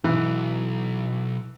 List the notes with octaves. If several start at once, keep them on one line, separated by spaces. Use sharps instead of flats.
B1 G#2 E3